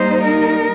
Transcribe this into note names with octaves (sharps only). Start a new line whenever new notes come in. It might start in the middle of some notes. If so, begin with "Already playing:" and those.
Already playing: G3 A#3 D#4 C5
A#4